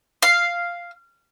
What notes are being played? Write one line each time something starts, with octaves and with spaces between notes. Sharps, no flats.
F5